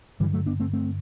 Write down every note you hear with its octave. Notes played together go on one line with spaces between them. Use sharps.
G2 D3 E3 G3
F#3 A3
B3 D4
A3 C4
A3 C4